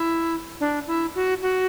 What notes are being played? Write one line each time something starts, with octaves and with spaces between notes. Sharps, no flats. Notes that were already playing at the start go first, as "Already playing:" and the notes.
Already playing: E4
D4
E4
F#4
F#4